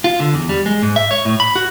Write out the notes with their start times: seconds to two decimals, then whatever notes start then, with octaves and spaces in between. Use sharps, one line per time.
0.04 F4
0.20 D3
0.34 E2
0.49 G3
0.66 G#3
0.83 G#2
0.96 E5
1.11 C#5
1.25 A2
1.40 B5
1.56 F#4